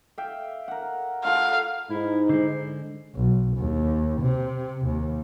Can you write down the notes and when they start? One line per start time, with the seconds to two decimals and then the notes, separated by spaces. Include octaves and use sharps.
0.18 E5 F5 G5
0.68 A#4 F#5
1.25 F4 A4 F5 F#5
1.90 G#2 D#4 E4
2.29 D3 G#3 C5
3.15 B1
3.57 D#2
4.20 C3
4.85 D#2